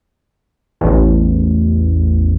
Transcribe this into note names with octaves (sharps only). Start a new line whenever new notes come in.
A1 E2